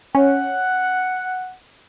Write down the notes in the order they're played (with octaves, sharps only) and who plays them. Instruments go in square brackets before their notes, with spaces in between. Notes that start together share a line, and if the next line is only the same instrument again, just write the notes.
[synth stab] C#4 [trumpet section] F#5